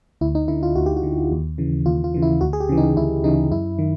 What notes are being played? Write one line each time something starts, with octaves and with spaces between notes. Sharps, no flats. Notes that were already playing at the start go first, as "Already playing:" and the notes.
D2 E4
D#4
D3 E4
F4
D2 F#4
G4
F#4
D3
D#2
C#3 E3
D#2 F4
F4
C#3 E3
E4
D2 F#4
G#4
G4
C#3 E3
D#4
D2 E4
C#3 E3 D#4
F#2 E4
D#3